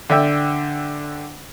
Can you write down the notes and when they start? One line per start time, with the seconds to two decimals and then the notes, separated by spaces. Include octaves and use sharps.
0.10 D3 D4 E5 G5